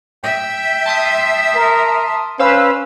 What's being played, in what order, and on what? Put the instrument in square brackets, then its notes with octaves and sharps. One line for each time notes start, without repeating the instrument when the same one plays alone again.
[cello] E5 [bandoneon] G5
[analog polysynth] A5 C6 D#6
[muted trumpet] A#4
[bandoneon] C#4 [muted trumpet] B4 [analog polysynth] C5 F5 E6